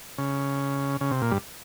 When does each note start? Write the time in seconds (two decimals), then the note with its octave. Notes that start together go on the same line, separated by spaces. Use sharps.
0.18 C#3
1.01 C#3
1.11 C3
1.22 A#2
1.31 G2